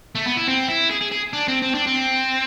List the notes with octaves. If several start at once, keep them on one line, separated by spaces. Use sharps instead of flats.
A3
B3
E4
C4
E4
G#4
G#4
G#4
D4
C4
C4
D4
C4